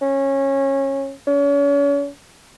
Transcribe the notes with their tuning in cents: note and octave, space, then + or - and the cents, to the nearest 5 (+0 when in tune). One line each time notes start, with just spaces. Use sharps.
C#4 -20
C#4 +40